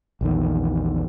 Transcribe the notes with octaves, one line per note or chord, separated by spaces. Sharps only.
A#1 E2 D#3